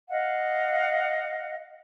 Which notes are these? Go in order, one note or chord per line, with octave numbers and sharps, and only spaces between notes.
D#5 F5 F#5